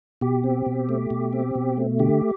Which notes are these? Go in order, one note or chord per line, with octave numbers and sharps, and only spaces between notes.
B2 G4
C4
B2
A3
B2
C4
B2
A3
D3 G4